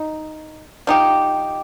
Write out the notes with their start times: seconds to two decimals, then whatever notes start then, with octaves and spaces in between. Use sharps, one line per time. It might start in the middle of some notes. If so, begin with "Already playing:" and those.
Already playing: D#4
0.87 F3 D#4 G4